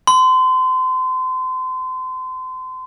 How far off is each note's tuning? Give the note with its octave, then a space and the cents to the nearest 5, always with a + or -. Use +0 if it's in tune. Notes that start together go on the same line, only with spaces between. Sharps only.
C6 -30